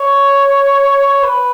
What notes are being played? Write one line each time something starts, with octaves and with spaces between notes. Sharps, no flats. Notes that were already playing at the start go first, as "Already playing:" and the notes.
Already playing: C#5
C#5
B4